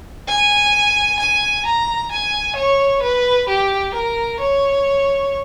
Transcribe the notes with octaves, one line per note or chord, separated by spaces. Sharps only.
G#5
G#5
A#5
G#5
C#5
B4
G4
A#4
C#5